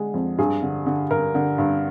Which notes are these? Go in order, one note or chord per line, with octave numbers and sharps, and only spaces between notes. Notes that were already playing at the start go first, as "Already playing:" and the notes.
Already playing: D3 G#3
F2
G2 G#4
D3
D3
G2 A#4
D3
G2